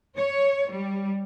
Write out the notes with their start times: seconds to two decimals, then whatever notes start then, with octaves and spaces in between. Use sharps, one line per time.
0.17 C#5
0.74 G3